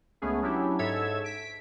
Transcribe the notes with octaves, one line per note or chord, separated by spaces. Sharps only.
C#2 A3 B3 C#4 G#4
F#3 C#4 D4 E4 G4
G#2 A4 C#5 E5 E6 G#6
B6 D7